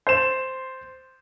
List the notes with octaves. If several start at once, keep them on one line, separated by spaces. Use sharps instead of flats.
C5 C6 E7